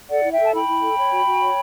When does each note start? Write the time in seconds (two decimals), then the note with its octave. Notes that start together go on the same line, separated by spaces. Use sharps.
0.09 A4 D5 F#5
0.24 E4
0.31 E5 G5
0.39 A4
0.44 A5
0.53 E4 G5 B5
0.68 E4
0.82 A4
0.97 C#5
1.12 F#4
1.27 F#4
1.41 C#5